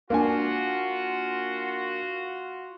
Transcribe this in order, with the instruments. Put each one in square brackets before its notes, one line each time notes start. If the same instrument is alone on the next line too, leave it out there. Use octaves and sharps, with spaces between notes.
[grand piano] A#3 D4 G#5 [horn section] F4 F#4